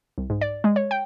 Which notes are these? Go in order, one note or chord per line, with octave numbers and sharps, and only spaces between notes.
C2
G#2
D5
G#3
C#5
G5